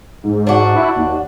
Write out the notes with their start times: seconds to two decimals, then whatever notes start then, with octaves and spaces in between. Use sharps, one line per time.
0.24 G#2
0.47 D4 F#4
0.76 E4
0.96 D#2